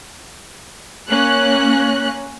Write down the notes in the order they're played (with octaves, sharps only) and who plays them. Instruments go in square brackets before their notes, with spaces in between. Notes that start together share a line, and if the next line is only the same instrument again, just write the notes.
[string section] A#3 C#4 F#6